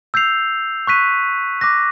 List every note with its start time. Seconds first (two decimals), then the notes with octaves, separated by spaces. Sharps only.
0.14 E6 G6 C7 F7
0.87 C#6 F#6 B6 D#7
1.61 D6 F#6 A#6